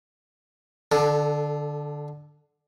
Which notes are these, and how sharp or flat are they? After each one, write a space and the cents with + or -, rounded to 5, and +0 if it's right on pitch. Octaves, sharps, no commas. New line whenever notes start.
D3 +15 A4 -15